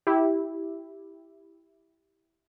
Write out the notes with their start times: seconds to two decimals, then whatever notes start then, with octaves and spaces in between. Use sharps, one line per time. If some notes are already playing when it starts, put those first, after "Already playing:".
0.07 E4 G4